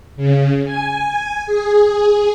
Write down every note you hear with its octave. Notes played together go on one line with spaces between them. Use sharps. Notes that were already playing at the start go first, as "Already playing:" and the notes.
C#3
G#5
G#4